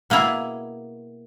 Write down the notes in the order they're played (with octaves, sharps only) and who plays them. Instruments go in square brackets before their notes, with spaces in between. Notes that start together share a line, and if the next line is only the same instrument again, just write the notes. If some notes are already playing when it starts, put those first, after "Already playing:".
[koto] B2 A#3 E4 G#4